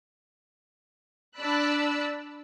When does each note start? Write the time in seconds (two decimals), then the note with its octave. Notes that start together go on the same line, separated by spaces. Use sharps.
1.37 D4 D5 B5 E6 F#6